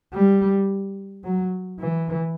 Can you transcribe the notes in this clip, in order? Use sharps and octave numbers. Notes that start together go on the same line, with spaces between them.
G3
F#3
E3